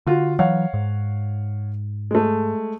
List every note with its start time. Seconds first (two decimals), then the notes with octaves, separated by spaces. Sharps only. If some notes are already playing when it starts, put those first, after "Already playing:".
0.07 D3 F4 F#4
0.39 E3 F#3 C#5 F5 F#5
0.74 G#2
2.11 G#3 A3